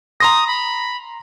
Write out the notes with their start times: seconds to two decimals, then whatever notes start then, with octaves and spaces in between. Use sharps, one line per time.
0.20 A#5 C6 D#6 A#6
0.47 B5